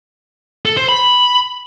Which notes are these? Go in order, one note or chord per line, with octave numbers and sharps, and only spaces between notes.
A4
C5
B5